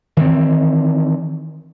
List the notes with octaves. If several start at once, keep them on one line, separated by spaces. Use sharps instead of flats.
D#3 E3 C4